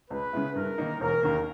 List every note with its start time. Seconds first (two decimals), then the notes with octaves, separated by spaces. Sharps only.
0.10 C#2 B4
0.33 C#3 G#3 B3 E4
0.56 G2 A#4
0.78 D#3 A#3 D#4
1.00 E1 A#4
1.23 D#2 D#3 A#3